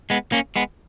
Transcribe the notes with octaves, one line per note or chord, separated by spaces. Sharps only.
G#3 B3
A#3 C#4
G#3 B3